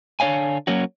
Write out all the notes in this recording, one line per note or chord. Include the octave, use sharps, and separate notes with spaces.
D3 D4 C#5 F5 G#5
F#3 A#3 C#4 F#4